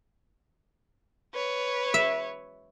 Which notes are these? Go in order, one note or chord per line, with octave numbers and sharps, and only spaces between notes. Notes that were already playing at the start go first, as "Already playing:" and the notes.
B4 C#5
E5